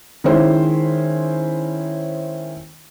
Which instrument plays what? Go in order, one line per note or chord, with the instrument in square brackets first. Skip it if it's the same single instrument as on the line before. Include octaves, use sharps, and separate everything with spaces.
[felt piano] D#3 G#3 C#4 E4 C5